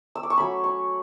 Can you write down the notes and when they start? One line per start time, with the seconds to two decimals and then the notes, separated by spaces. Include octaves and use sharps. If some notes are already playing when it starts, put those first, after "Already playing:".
0.15 E6
0.23 D6
0.30 C#6
0.37 F#3 A3 C#4 B5
0.64 C#6